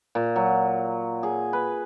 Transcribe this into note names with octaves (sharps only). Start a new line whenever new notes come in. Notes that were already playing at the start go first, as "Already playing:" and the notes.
A#2
F#3
G#4
B4